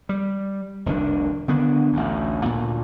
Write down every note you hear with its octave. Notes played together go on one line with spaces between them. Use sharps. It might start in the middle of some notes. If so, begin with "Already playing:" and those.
G3
F1 C2 D#3 D4
D3 D#3 B3 D4
A1 D2
D2 A#2